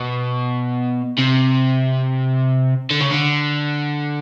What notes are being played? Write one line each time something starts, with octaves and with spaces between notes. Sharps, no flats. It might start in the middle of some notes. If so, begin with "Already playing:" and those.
Already playing: B2
C3
D3
C#3
D3